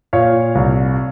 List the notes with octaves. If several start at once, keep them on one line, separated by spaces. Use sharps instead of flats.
A#2 C#5 F5
C2